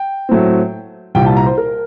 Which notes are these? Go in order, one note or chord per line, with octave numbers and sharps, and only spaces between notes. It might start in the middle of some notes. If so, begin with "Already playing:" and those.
Already playing: G5
A2 F#3 A3 C4
C2 A#2 G3 G5
A5
A#5
C5
A#4